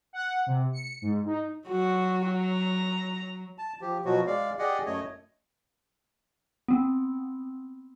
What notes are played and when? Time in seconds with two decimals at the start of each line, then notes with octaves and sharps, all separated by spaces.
0.13 F#5
0.46 C3
0.73 C#7
1.02 G#2
1.26 D#4
1.68 F#3 F#4
2.41 A#5
3.58 A5
3.81 F3 G4
4.05 B2 F3 F#3 F#4
4.27 G#3 D5 F5
4.59 G4 G#4 D5 D#5 F#5
4.86 F#2 A3 C#5 D#5
6.68 B3 C4